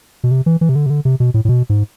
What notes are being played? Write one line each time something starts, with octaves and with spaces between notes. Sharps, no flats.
B2
C3
E3
E3
C3
D3
C3
D3
C3
B2
A2
A2
B2
G#2